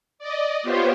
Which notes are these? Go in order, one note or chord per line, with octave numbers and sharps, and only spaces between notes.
D5 D#5
B3 F4 G4 C5 C#5